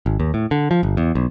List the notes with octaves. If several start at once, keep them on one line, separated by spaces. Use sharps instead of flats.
G#1
D#2
A2
D3
F3
G1
E2
B1